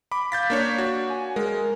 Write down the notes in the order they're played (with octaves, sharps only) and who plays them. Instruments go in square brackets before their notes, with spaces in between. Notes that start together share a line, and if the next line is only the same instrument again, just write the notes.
[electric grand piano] B5 D6
[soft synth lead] F5 [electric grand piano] G6 A6 B6
[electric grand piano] A#3 D4 C#5
F#4
[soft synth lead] G#5
[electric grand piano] G#3 [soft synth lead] A#4